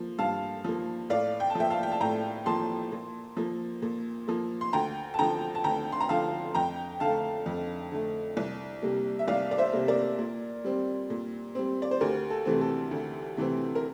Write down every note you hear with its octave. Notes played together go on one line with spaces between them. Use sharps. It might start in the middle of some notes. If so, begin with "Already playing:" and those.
Already playing: F3 A#3
G2 F5 A5
F3 A#3
A2 D5 F5
G5
A5
F3 A#3 E5 G5
F5 A5
G5
A5
A2 G5 A#5
F3 A#3 A5 C6
A#2
F3 A#3
A#2
F3 A#3
C6
D2 G5 A#5
A5
D3 F3 G5 A#5
A5
D2 G5 A#5
C6
A#5
D3 F3 F5 A5
F2 G5 A#5
D3 A3 F5 A5
F2
D3 A3
C2
C3 G3 A#3
E5
C2 D5 F5
D5
C5 E5
C3 G3 A#3
A#4 D5
A#2
G3 C4
A#2
G3 C4
D5
C5
D2 G4 A#4
A4
C3 E3 A3 C4
A4
D2
C3 E3 A3 C4
A#4